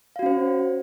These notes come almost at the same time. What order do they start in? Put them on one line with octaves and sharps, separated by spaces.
F5 F#4 C#4 C5